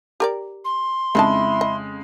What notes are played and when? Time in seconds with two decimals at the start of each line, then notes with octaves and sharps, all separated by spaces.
0.20 G4 A#4 D5
0.65 C6
1.15 F2 C#3 G#3 D#4 E4 D#5 A5
1.61 D#5